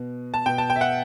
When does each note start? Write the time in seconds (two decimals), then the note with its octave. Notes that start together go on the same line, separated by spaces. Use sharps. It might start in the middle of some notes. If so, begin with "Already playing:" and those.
Already playing: B2
0.34 A5
0.46 B2 G5
0.58 A5
0.70 G5
0.76 E5
0.81 F#5